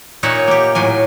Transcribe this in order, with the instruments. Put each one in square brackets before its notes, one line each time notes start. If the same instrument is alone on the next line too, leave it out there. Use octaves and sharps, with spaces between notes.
[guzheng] A#2 D#4 C#5 E5 F#5
A#3 G4
A2 F#3 G#5